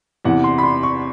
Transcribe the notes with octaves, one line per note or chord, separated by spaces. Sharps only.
E2 C3 E3 F#5
C6
B5
C6
C#6